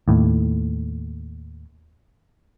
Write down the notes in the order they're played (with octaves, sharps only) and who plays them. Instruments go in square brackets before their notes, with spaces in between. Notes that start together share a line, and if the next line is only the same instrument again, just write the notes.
[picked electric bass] D#2 A2